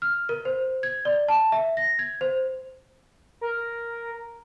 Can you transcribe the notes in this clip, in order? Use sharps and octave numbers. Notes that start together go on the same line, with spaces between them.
F6
A#4
C5
G#6
D5
A5
E5
A#6
G#6
C5
A#4